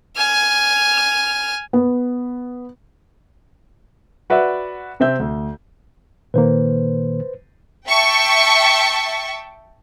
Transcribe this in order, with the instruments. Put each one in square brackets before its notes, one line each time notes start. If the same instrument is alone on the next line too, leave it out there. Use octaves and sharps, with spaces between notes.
[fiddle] G#5 F6
[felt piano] B3
[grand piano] F#4 B4 D5 E5 F#5
C3 C4 E5 G6
D2
[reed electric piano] A#2 D#3 A#3 [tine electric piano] B4 C5
[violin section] E5 G5 A5 C#6